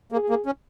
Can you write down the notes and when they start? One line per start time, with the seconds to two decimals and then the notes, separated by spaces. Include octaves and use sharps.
0.12 A#3 G#4
0.30 A#3
0.46 C#4